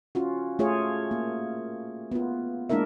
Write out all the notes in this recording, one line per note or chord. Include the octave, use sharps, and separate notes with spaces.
C#4 F4 F#4
A3 F4 G#4 C#5
A#3
B3 F4
G#3 A#3 D4 E4 A#4 E5